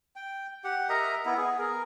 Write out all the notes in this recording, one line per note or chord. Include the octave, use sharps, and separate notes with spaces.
G5
G4 F#5
A#4 D#5 E5 A#5
B3 E4
B3 G#4
G#4 A#4